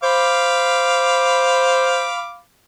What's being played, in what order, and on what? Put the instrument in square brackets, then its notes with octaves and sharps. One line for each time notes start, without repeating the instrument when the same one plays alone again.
[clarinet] C5 [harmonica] F5 B5 D6